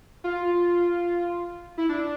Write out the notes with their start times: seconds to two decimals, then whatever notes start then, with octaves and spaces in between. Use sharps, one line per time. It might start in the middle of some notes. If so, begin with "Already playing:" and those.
0.24 F4
1.78 E4
1.89 D4